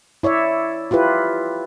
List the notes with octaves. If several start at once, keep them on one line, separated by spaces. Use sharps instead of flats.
E4 C#5 D5 E5
E4 F4 G4 B4